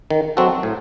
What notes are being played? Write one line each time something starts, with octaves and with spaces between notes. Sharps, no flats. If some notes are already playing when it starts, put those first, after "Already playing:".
D#3
F#3 C4 F#4 A4
A2